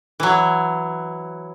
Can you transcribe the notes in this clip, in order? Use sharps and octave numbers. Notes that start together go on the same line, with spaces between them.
E3 F#3